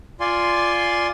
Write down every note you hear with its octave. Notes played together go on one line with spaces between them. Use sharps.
F4 D5 G#5 C6